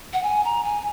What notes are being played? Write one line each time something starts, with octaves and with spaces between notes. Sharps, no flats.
F#5
G#5
A#5
G#5